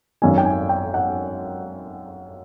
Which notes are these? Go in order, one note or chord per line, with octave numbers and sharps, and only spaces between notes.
G#1 F#2 D#3 G#5
G5
G#5
G5
F#5